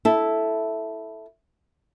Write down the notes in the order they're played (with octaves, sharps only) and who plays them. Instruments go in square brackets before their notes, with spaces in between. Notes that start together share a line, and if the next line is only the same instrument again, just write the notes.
[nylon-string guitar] E4 A4